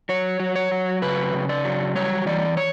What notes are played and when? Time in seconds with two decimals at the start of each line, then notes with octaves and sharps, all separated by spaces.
0.09 F#3 C#5
0.40 F#3
0.56 C#5
0.72 F#3
1.02 C#3 B4
1.34 C#3
1.49 D5
1.65 F#3
1.95 G3 C#5
2.26 E3 D5
2.57 C#5